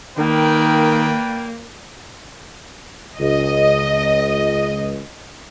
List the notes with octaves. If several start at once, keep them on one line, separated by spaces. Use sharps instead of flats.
D#3 A#3 B4 D5 G5
C#2 D#5